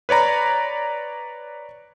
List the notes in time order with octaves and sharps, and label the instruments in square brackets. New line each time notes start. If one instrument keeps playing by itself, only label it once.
[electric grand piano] B4 C#5 D5 A#5 B5